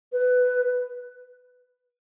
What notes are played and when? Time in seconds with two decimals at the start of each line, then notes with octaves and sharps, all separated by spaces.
0.12 B4